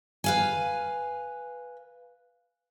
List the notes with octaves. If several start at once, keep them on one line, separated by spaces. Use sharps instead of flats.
B4 F5 G#5